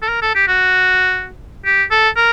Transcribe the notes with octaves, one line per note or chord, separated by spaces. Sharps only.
A4
A#4
A4
G4
F#4
G4
A4
A#4